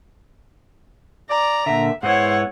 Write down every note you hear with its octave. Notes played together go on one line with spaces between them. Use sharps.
D5 A#5
A#2 D3 E5
G#2 B3 E4 C5 C#5 F#5